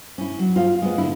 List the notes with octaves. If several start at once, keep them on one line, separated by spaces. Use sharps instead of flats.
C#4 E4
F#3
F4 F5
G#3 B3
D3 E4